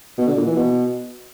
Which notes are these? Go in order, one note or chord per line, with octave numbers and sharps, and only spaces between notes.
B2
D3
A#2
E3
B2